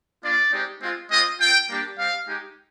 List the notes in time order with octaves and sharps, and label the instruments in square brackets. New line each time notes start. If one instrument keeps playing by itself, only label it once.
[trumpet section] A#3 D4 F4 D5
G#3 C4 D#4 G4
G#3 C4 F4
G#3 C4 F4 D#5
C4 F4 G5
G3 A#3 D4 G4
G3 C4 G4 F5
G#3 D#4 G4